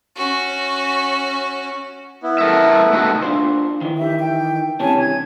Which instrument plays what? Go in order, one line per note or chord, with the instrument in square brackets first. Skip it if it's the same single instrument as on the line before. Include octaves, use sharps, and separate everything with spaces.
[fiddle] C#4 F#4
[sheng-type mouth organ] B3 E4
[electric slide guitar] A4 A#4 E5
A3 D#4 F#4
[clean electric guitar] D4 F4 C5
D#3 E3
[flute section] G4 E5
G5
[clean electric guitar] C3 E3 C#4 [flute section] C#5 G#5 A5
[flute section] G#6